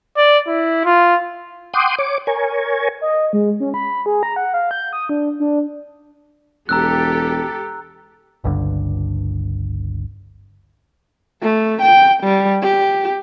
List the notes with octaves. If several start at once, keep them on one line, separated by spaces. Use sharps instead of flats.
D5
E4
F4
F#5 G5 C6 D6 D#6
C#5 D6
A#4 C#5 G#5
D#5
G#3
C#4
B5
G#4
A#5
F#5
F5
G6
D#6
D4
D4
E1 G4 A4 A#5 E6 F#6
G1 C#2 G2 D3
A3
G5
G3
G4